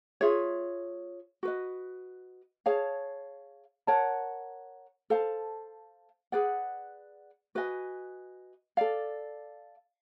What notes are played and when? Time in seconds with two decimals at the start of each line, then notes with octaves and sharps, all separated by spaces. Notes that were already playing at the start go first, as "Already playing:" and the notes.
0.21 F4 G#4 C#5 E5
1.43 F#4 B4 D#5
2.66 G#4 C#5 F5 A5
3.87 A#4 C#5 F#5 A5
5.10 A4 C5 F5 A5
6.32 G#4 B4 D5 F#5
7.55 F#4 B4 D#5 G#5
8.77 A4 D5 F5